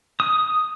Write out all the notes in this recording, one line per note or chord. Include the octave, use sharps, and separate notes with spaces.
D#6